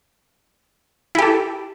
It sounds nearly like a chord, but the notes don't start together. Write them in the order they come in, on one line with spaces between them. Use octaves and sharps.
E4 G4 A4